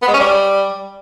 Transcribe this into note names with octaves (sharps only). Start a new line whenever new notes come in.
B3
G#3
C#4
G3